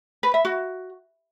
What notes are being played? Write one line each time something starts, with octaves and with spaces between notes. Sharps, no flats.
B4
E5
F#4